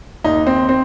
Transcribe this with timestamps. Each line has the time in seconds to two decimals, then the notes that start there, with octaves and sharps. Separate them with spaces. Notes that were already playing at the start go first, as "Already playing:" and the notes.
0.24 D#2 D#4
0.47 C4
0.69 C4